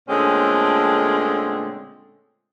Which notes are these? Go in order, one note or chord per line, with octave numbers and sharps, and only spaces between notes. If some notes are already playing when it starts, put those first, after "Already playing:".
A#2 D3 G#3 A3 C4 C#4